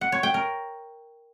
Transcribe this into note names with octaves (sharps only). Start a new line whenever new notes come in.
F#5
C#5
G5
A#4